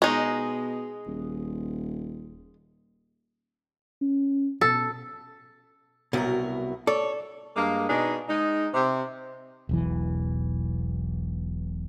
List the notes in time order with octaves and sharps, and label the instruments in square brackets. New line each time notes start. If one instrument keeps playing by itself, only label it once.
[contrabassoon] B2 [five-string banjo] G#3 D#4
[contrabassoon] D#1
[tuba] C#4
[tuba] B2 [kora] A4
[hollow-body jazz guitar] C2 B2 [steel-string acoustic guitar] F#3 E4 A#4
[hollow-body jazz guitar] A4 [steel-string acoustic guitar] C#5 [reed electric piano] D5
[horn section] G2 G#3 A#3
B2 D4 D#4 G#4
G#3 D#4
C3
[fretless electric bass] E1 B1 E3